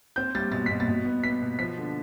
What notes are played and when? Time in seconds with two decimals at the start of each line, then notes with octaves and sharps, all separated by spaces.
0.16 C4 G6
0.35 G3 A6
0.52 B2 A6
0.66 B2 B6
0.80 A6
0.88 B2
1.05 B3
1.24 B3 B6
1.42 B2
1.59 F3 B6
1.78 D3